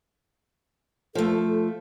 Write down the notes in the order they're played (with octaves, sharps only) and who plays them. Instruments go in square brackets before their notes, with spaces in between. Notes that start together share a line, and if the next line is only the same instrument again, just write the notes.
[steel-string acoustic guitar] F3 A3 [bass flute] A4